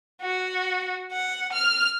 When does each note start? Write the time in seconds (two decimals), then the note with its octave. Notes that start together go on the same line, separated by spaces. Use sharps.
0.21 F#4
1.12 F#5
1.53 F6